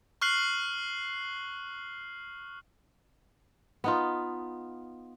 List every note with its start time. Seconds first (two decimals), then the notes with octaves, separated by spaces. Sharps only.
0.21 C#6 F6 F#6 C7 F#7
3.84 B3 D#4 F4